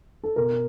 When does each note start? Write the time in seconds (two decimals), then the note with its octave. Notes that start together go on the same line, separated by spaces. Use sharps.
0.24 A4
0.36 B2 A#4